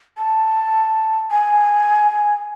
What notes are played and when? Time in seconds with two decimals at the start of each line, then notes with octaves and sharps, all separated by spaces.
0.18 A5
1.31 G#5